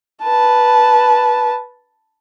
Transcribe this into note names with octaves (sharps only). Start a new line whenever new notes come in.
B4 A5